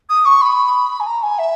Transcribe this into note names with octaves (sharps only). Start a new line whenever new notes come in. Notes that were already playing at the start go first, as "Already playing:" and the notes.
D#6
C#6
B5
G#5
A#5
G#5
E5